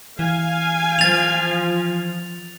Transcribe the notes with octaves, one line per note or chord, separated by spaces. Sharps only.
E3 F5 G#5
F3 A6 F7